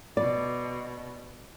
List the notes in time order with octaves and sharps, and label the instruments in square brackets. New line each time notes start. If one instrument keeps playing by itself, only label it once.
[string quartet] B2 [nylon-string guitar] D5